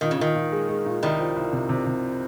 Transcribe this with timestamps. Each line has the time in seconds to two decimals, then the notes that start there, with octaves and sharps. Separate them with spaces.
0.01 A#2 D#3
0.11 C#3
0.18 A#2 D#3
0.35 A#2
0.52 G#3
0.69 G#3
0.86 A#2
1.03 C2 D#3 G3
1.19 F3
1.36 C2
1.53 C3
1.69 C3
1.86 C3